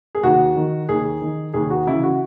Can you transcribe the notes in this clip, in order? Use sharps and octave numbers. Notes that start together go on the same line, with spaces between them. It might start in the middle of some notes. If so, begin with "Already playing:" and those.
G#4
D#2 F#4
D#3
D#2 G#4
D#3
D#2 G#4
F#4
C#3 E3 E4
F#4